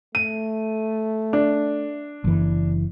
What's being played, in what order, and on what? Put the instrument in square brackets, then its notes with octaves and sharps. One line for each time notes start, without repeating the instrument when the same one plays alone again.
[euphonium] A3 [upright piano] D#7
[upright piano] D4
[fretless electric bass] F#1 E3